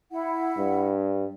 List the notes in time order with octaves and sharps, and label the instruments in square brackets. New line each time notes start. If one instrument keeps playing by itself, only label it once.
[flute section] E4 F#5
[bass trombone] G2